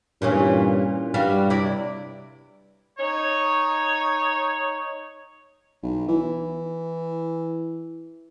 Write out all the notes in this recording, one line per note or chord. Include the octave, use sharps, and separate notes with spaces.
G2 A#2 E3 C#4
G2 G3 F#4 F5
C3 E4 D5
D#4 C#5
B1
E3